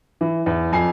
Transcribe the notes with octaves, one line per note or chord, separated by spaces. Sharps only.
E3
E2
F2 G#5 C7